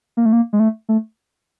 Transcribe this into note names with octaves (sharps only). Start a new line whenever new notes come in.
A#3
A3
A#3
G#3
A3
A3